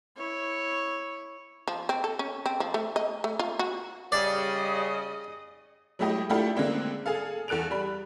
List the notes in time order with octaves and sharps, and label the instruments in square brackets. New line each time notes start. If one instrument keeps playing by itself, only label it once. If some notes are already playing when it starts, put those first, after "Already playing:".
[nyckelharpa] E4 C#5
[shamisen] F3
C4
A4
C#4
C4
F3
A3
D#5
A3
F4
F#4
[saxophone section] C#3 [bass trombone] G3 [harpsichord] D5 [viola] D#5
[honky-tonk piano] F#3 G#3 A3 E4 G4 D#5
A3 D4 E4 F4 G4 A4
D3 G#3 A#3 C4 D4
G#4 A4 F5
E2 A4 F#6 D7 F7
G3 B5